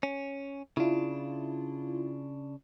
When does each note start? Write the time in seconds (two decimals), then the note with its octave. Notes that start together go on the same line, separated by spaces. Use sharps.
0.03 C#4
0.77 C#3 D4 E4 F4